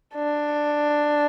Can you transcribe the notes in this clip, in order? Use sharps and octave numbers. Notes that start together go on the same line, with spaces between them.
D4